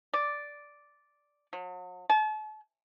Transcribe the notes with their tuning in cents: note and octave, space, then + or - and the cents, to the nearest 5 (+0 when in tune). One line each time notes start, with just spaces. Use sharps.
D5 -5
F#3 -40
A5 -40